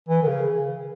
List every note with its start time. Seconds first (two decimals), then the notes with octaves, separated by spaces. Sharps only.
0.09 E3
0.23 D#3
0.27 C#3